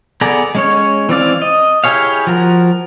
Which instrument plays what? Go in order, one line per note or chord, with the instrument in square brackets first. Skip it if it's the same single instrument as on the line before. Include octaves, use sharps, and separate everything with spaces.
[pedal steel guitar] B3 G#4 A4 D5 A#5
G#3 C#4 C#5
E3 C4 D5 F5
D#5
E4 G4 G#4 C#5 F5
F3 F#4 A#4